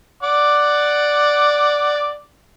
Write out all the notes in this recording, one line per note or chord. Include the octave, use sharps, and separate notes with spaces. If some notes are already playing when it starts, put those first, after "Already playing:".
D5 F#5 D6